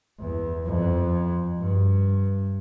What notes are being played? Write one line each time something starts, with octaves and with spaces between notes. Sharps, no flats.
E2
F2
G2